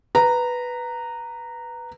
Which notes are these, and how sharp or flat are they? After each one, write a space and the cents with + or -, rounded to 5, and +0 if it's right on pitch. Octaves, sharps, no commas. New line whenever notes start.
B4 +0 A#5 -10